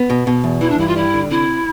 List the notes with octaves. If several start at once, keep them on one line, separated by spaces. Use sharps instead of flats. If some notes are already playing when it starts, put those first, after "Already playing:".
Already playing: B3
B2
B2
E2
E3 E4
D4
G2 E4
F4
G3 E4
D3
C3 E4